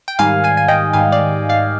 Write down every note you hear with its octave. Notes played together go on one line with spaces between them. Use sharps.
G5
G#2 D#3 G3 F5 G#5
F5 G#5
G#5
D#5 G5
G#2 D#3 G3 F5 G#5
D5 F5
D5 F5